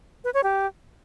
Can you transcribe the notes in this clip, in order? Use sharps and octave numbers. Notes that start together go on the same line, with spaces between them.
B4
C#5
G4